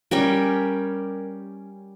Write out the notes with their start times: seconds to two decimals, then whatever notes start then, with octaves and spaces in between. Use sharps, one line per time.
0.11 G3 C#4 G4 A#4